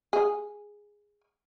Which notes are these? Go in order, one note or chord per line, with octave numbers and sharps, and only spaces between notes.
G#4